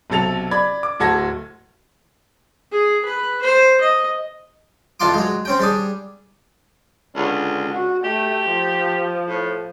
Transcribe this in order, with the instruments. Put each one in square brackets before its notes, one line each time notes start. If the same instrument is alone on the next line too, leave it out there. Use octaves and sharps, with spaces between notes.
[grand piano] B1 C3 F#3 A4 A6 F7
D5 B5 G#6
D6
D1 F#4 A4 G#6 A#6
[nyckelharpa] G#4
B4
C5
D#5
[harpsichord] F2 E3 D4 F4 C6 D6
F#3 G#3
C4 C#4 G5
G3 D4 G#4
[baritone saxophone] C#2 [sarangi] D3
[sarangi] F#4
[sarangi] A3 [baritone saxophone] G4
[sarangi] F3
[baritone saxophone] A2